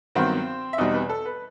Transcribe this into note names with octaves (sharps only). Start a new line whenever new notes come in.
G2 D#3 F#3 B3 C4 C5
E5
E2 B2 G3 C4 D#4 D#5
B4
A4
B4